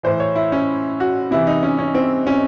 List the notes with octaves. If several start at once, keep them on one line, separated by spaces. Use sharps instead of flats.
A2 E3 C5
C#5
E4
C#4
F#4
C3 E3 E4
D#4
C#4
C#4
C4
C#4